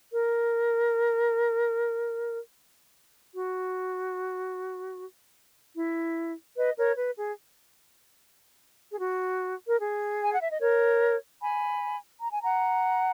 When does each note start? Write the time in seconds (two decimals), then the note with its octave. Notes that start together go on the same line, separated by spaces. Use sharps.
0.12 A#4
3.34 F#4
5.76 E4
6.56 B4 D#5
6.77 A#4 C#5
6.96 B4
7.17 G#4
8.92 G#4
8.98 F#4
9.67 A#4
9.80 G#4
10.22 G#5
10.31 F#5
10.41 E5
10.50 D#5
10.59 A#4 C#5
11.40 G#5 B5
12.21 A#5
12.32 G#5
12.42 F#5 A#5